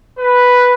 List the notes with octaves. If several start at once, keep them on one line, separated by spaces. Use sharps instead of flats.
B4